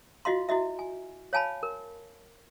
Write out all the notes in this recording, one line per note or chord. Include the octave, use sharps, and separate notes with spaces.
F4 F#4 D#5 F5 C6
E4 F#4 D#5 E5
G#5
C#5 F5 G#5 A5 B5
A#4